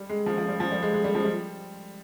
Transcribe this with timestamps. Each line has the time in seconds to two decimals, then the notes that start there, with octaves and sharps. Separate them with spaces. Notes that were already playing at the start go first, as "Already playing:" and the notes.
Already playing: G3
0.09 G#3
0.26 F3
0.38 F3
0.48 G3
0.60 F3
0.72 G3
0.83 G#3
0.94 G#3
1.04 G3
1.15 F3
1.25 G3